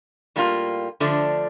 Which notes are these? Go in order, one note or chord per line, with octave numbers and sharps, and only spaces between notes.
A2 G3 A#3 F4
D3 F3 A3 D4